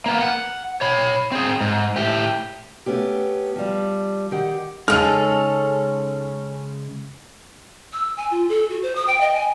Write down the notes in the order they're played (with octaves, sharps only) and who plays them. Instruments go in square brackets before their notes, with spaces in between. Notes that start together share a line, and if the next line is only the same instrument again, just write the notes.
[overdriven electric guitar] A#3 B3
F#5
C#5 B5
C4 G#4
G#2
A2 G4
[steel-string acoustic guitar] A3 B3 C#4 G4
F3 G3
D#3 G4 F#5
[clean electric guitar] C#3 G#3 [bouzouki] C#4 A4 [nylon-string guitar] D#4 G#4 [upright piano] F6 F7
[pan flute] E6
G#5
F4
A4
F#4
C5
D#6
G5
D#5
G#5